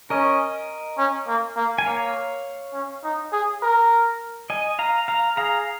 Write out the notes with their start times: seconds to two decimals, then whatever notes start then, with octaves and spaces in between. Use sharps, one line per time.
0.10 C#4 A#4 D#5
0.98 C#4
1.27 A#3
1.56 A#3
1.78 G#5
1.86 A#3 C#5 F5
2.74 C#4
3.04 D#4
3.32 G#4
3.62 A#4
4.50 D#5 G#5
4.79 F5 A#5
5.08 F5 A#5
5.37 G#4 F5 A#5